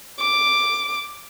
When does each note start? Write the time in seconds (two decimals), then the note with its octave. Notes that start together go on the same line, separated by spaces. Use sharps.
0.20 D6